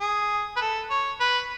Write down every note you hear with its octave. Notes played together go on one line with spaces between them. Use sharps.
G#4
B4
A4
C#5
B4